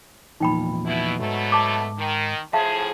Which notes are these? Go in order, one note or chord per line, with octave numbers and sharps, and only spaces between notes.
E2 A#2 F3 D#4 G5 B5
B2 E4
G#2 B2 F#3 A3
A5 D6
D#3
A2 F3 G#4 E5 F5 A5